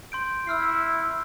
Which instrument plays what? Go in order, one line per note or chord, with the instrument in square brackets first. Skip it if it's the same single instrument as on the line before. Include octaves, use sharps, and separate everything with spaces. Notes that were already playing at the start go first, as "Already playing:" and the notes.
[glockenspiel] C6 G6 D7
[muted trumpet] E4 [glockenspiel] E6 F6 C7